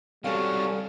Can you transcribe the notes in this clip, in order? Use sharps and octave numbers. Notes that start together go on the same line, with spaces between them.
C3 F#3 G3 C#4 A4 F5 F6